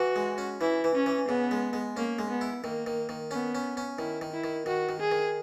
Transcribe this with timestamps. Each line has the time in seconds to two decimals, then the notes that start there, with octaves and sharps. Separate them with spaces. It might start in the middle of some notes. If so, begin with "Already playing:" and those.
Already playing: E3 F#4
0.16 G#3
0.38 C#4
0.61 E3 E4
0.84 E3
0.95 C#4
1.06 E3
1.28 C#3 B3
1.51 G#3
1.73 G#3
1.97 A#3 C#4
2.19 G#3
2.30 B3
2.41 E4
2.64 D#3 A#3
2.86 D#3
3.09 D#3
3.31 B3 C#4
3.55 C#4
3.77 C#4
3.99 D#3 E4
4.21 D#3
4.32 E4
4.44 D#3
4.66 D#3 F#4
4.89 D#3
5.00 G#4
5.11 D#3